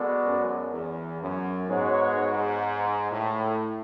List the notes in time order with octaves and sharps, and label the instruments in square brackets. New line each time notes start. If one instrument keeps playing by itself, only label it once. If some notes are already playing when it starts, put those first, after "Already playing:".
Already playing: [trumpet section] G#3 B3 F#4 A4 D5
[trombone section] F#2
E2
F#2
[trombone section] G#2 [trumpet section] G#3 B3 F#4 C#5
[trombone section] G#2
A2